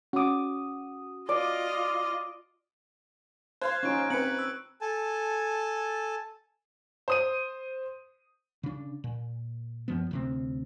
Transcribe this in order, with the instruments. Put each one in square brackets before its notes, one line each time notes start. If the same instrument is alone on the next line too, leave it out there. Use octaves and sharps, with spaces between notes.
[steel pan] C#4 D6 [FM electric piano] F#4 D#6
[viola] F4 D#5 [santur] D5
[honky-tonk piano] C5 F5 C6 [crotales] F#6 G#6
[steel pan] C#4 D#4 F4 [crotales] C#6 D7
[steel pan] C4 [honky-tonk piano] B4 A#5 [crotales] F#6 C#7 F#7
[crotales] E6
[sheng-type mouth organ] A4 G#5 A5
[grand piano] C5 D#6 D#7
[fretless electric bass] C#3 D4
A#2
F#2 F3 B3
D2 C3 C4